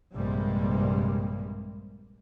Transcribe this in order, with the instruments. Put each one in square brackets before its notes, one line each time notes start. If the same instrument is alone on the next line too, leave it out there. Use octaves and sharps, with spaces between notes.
[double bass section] A#1 G2 C3 G3 G#3 A#3